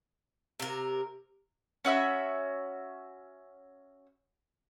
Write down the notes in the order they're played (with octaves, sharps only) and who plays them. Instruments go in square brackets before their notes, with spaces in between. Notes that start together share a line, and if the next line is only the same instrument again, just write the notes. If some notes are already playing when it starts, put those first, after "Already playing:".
[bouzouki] C3 A#4
[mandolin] C#4 F#4 E5 B5